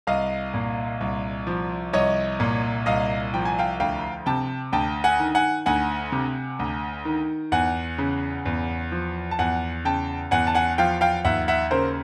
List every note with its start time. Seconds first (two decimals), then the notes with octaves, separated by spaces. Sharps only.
0.07 C2 D#5 F5
0.54 A#2
1.01 C2
1.47 F3
1.93 C2 C#5 D#5
2.40 A#2
2.86 C2 D#5 F5
3.34 F3 G5
3.45 G#5
3.59 F5 G5
3.80 D2 F5 G5
4.26 C3 G5 A5
4.72 D2 G5 A5
5.04 F#5 G#5
5.19 D#3
5.35 F#5 G#5
5.66 D2 F#5 G#5
6.12 C3
6.59 D2
7.05 D#3
7.52 E2 F#5 G#5
7.98 C#3
8.45 E2
8.92 F3
9.31 A5
9.39 E2 F#5 G#5
9.85 C#3 G5 A5
10.31 E2 F#5 G#5
10.47 A5
10.55 F#5 G#5
10.78 F3 F5 G5
11.01 F5 G5
11.25 D#2 E5 F#5
11.48 E5 F#5
11.71 C#3 A#4 C5